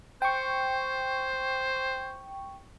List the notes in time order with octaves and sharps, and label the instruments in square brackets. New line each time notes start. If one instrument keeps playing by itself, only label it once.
[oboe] C5 [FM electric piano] G5 C#6